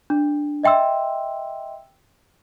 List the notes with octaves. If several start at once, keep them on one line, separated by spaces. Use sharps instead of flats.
D4
D#5 E5 G5 C6 E6